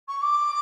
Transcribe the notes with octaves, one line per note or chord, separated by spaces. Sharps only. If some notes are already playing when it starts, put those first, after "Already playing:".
C#6
D6